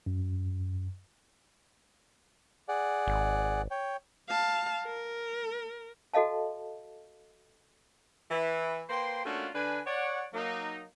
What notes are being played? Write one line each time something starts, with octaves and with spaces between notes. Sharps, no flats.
F#2
G#4 D5 F#5
G#1
C#5 G5
F5 A5
A#4
F#4 A4 D#5 F5 A5
E3 E4
A#3 B4 C5 G5 C6
A3 A#3 C#4 D4 F4 F#4
D3 D4 B4 G#5
C#5 D5 F#5
F#3 A#3 D#4